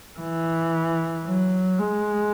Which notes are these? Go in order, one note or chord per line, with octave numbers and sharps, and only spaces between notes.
E3
F#3
G#3